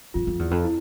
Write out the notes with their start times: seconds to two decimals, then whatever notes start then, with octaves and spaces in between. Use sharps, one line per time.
0.14 F2 F4
0.27 F2
0.39 E2
0.51 F2
0.64 E4